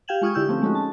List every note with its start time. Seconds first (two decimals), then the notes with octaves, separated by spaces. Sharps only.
0.08 G4 F5 G5 G#6 E7 F#7
0.22 G#3 F4 C#6 D#6 F6 G#6
0.35 D3 E4 G4 E6 G6
0.48 F3 A3 C4 C#4
0.62 G#3 A3 C#4 D#4 F#4
0.75 A5